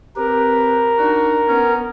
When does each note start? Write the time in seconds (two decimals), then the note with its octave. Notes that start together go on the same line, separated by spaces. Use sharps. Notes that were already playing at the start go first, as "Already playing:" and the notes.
0.16 C4 G4 A#4 B4
0.98 D4 D#4 F#4
1.48 B3 C#4